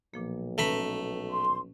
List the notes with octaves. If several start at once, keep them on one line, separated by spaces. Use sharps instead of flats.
B1 A#2 F3 A#3
A3 C#4 B4 A#5 B5
C6